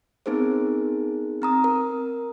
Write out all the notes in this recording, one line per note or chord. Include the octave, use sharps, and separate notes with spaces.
B3 C4 D#4 G#4 A#4 C5
C4 A#5 D#6
A#4